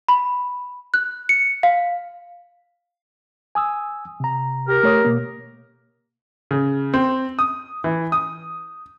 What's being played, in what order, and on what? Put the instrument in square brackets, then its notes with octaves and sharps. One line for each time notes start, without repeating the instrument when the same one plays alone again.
[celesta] B5
F#6
C#7
F5
[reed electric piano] G#5 D#6 E6
C3 A#5
[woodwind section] G4 A#4
[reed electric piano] A3 C#5 D#6
B2 A#3
[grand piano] C#3
C4
D#6
E3
D#6